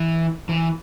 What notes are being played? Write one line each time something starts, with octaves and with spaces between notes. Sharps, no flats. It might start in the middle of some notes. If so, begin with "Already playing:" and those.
Already playing: E3
E3